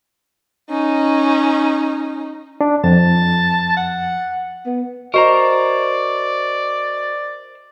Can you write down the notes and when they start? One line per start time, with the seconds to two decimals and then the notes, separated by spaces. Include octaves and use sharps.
0.69 C#4 D#4
2.61 D4
2.84 F2 A5
3.77 F#5
4.66 B3
5.14 F#4 A#4 C5 D5 D#5 A#5 C#6